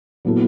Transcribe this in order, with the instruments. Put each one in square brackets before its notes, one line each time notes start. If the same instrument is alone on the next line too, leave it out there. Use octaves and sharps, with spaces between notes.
[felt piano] A#2 F#3 B3 E4 A4